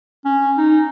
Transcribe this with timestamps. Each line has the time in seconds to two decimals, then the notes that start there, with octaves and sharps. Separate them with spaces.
0.25 C#4
0.57 D#4